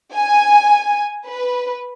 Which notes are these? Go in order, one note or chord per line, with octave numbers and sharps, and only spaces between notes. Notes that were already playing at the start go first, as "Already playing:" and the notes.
G#5
B4